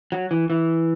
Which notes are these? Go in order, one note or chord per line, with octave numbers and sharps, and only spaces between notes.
F#3
E3
E3